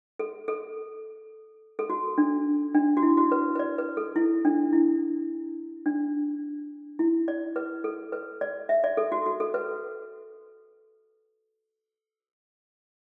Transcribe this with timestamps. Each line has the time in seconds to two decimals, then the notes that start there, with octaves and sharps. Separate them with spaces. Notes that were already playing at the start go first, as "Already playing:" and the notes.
0.19 A4
0.48 A4
1.79 A4
1.90 F#4
2.18 D4
2.75 D4
2.97 F#4
3.03 E4
3.17 F#4
3.32 B4
3.55 B4
3.59 D5
3.78 B4
3.97 A4
4.16 E4
4.45 D4
4.73 E4
5.86 D4
6.99 E4
7.28 D5
7.56 B4
7.84 A4
8.12 B4
8.41 D5
8.69 E5
8.84 D5
8.97 A4
9.12 F#4
9.26 F#4
9.40 A4
9.54 B4